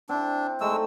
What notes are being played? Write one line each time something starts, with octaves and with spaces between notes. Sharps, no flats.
C4 D4 E4
G#3 A3 D#4 E6